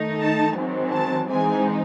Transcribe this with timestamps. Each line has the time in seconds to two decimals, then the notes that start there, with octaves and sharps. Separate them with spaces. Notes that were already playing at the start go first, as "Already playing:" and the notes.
Already playing: D#3 A3 D#4
0.19 A5
0.55 G#2 D#3 F#3 C4
0.91 A5
1.28 G#2 E3 G#3 C4 D#4 G#5